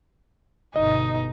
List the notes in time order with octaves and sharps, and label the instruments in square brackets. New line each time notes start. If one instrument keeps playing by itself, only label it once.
[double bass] G1 B2 [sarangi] D#4 [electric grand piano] D#5